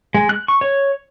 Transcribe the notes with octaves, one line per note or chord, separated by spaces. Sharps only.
G#3
F#6
C#6
C#5